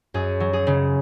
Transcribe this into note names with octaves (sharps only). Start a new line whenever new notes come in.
F#2 G#4
F#3
G#4
C#3